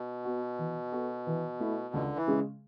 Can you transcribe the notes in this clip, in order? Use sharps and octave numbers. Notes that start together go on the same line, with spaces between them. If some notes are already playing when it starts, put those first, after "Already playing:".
Already playing: B2
B3 F#4
E3
B3 F#4 A4
E3
A3 E4
C#2 D3
E3
C#3 G#3 C#4 G#4